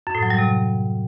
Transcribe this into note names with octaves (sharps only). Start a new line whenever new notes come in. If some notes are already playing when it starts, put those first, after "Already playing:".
F#2
A2
F#3
G3
C3